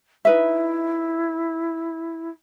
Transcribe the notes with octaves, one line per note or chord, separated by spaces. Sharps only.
D#4 E4 B4 E5